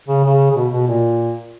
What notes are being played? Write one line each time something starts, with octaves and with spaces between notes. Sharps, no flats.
C#3
C#3
C#3
B2
B2
A#2